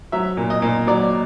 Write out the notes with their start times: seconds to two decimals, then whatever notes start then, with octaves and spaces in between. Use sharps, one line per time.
0.12 F#3 E5
0.37 A#2
0.50 D#5
0.62 A#2
0.87 F#3 D5